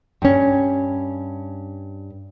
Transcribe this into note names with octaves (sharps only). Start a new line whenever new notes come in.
G2 C#4